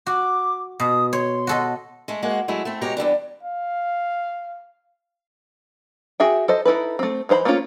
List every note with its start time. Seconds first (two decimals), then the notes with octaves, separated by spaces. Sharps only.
0.06 F#4 D6
0.80 B2 D#6
1.13 C#5 C6
1.47 F#4 A4 D#5
2.08 G#3 A3
2.23 G#3 A#3 F#4
2.48 F#3 G#3 A3 E4
2.65 A3 C4
2.81 B2 G#3 G4 C#5 A#5
2.97 E2 F#3 G3 D4
3.43 F5
6.20 F#4 G#4 E5 G5
6.48 A4 C5 D#5
6.65 D#4 E4 A4 B4
6.99 A3 C4
7.29 E3 D#4 C5 A#5 B5
7.45 A3 A#3 C4 C#4 F4